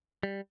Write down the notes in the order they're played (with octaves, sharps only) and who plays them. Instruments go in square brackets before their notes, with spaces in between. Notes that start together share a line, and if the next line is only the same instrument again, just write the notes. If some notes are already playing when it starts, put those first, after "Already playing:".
[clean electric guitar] G3